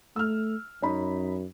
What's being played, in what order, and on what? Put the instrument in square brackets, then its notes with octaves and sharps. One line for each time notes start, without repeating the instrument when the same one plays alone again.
[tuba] A3 [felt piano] E6 F6
[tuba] F#2 [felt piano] C#4 D#4 B5